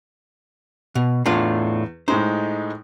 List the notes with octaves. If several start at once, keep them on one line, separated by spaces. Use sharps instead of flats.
B2
E2 A2 D4 F4
A2 G#3 D#4 C5